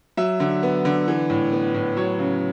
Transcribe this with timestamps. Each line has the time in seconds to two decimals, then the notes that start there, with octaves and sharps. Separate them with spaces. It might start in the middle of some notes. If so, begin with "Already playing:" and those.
0.17 F#3 E5
0.40 D3
0.63 B3
0.85 D3
1.08 E3
1.30 A2
1.52 B3
1.74 A2
1.97 F#3 C#5
2.19 C#3